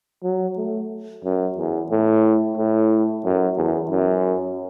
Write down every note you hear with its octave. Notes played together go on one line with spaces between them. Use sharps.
F#3
A3
F#2
E2
A2
A2
F#2
E2
F#2